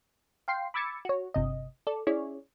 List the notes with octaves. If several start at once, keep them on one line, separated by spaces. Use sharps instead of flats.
F5 G5 C6 C7
B5 D6 E6 G#6 A6 C#7
F#4 C#5
G1 C3 D#5
A4 D5
C#4 E4 G#4 C#5 D5